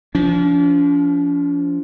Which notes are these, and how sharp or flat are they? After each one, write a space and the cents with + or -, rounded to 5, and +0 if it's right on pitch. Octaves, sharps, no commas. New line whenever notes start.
F3 -10 D4 -45